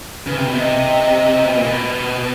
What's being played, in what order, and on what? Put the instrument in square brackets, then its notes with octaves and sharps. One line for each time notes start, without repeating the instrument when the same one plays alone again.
[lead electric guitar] C#3 [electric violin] B4
[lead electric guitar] C3
B2
[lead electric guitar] C3 [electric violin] D#5
[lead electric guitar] B2
A#2
B2